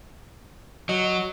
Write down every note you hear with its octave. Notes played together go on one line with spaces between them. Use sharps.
F#3 D#5